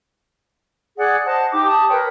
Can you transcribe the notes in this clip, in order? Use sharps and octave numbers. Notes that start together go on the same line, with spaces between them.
G#4 D5 F#5
C5 D#5 F#5 A5
D#4 G4 D6
A5 D#6
A#4 B4 C#5 G5